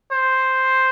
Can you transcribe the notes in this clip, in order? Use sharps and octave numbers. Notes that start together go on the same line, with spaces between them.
C5